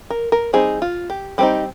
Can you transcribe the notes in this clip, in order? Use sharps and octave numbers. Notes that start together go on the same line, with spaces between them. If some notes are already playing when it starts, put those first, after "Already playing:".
A#4
A#4
G3 C4 D#4 G#4
F4
G4
G3 C4 D#4 G4